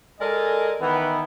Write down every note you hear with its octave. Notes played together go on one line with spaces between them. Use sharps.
G#3 A4 A#4 D5 D#5 G#5
D#3 E3 B3